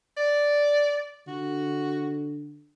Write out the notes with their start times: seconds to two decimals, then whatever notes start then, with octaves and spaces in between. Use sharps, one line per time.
0.17 D5
1.27 D3 F#4